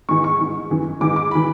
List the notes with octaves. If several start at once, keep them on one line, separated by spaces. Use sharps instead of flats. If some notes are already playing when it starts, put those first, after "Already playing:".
G#2 E3 C#6
C#6
G#2 E3
F#2 E3
G#2 E3 D6
D6
E3 B5